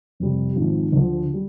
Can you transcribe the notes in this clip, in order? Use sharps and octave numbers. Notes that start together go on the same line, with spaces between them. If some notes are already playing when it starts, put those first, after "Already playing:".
F2 C3 G3
G#1 G#2 F3
D2 D3 F3
G3